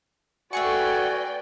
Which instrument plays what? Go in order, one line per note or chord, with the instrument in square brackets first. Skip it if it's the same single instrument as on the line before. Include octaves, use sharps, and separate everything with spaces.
[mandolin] A3 G#4 C#6 [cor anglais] F#4 [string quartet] B4 D5 G5 [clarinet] G#5